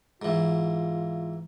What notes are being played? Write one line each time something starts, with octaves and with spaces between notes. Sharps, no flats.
G#2 E3 F4